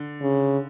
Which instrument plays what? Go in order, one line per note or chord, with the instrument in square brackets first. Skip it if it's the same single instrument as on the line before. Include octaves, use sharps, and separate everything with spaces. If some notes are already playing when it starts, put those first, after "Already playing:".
Already playing: [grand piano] D3
[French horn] C#3